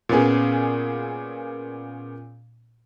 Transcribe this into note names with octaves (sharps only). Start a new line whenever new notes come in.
A#2 B3 C#4 G#4